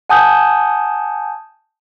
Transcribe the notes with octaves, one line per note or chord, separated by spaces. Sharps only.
F#5 G#5 A5 D#6 G6